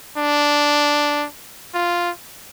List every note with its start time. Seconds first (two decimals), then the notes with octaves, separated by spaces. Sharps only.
0.17 D4
1.74 F4